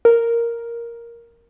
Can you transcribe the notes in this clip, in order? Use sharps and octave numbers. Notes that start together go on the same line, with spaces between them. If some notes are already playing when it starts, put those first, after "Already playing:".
A#4